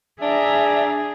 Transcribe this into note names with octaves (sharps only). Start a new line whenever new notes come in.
D4 G#4 E5 A#5